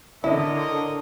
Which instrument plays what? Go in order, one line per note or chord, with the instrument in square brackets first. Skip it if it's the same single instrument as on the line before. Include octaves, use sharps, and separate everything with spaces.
[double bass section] D3 [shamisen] E4 [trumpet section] A#4 C#5 D#5